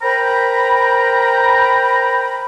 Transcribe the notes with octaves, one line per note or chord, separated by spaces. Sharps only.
A#4 C5 G5 A#5 B5